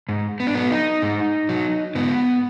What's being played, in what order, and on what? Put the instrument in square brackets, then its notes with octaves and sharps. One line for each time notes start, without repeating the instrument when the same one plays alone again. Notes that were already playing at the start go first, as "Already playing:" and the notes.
[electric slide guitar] G#2
B3
D4
F#3 B3
D#4
G#2
F#3
G#2 B3